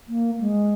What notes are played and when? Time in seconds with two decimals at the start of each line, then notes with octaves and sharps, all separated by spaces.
0.08 A#3
0.41 G#3